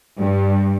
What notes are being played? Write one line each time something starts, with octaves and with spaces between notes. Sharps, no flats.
G2